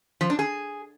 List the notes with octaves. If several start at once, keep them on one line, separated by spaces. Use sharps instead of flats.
F3
D4
G#4